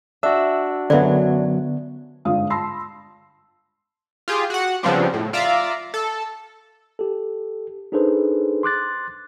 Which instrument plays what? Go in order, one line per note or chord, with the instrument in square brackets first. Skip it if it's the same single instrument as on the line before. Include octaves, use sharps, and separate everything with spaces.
[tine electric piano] D4 F#4 [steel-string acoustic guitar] E5 [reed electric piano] E6
[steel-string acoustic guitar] F#2 F#3 [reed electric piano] D3 B3 [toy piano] D5 E5
[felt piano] G1 G#2 D4 F4 F5 D#6
A5 B5 C6 E6 A#6 C7
[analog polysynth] F4 G4 G#4
F#4 F#5
C#3 F3 G3 B3 C4 D4
A2
F4 D5 E5 F5 A#5
A4
[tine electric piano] G4 A4
D4 D#4 G#4 A4 B4 C5
C6 D6 F#6 A6